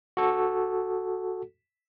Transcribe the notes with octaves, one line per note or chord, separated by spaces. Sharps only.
F#4 A4